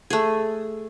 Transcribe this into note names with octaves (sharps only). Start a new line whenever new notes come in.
A3 G#4